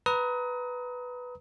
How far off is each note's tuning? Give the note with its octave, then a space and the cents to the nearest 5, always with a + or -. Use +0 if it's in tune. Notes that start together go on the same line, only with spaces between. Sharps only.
B4 +0 A#5 +0 D#6 +30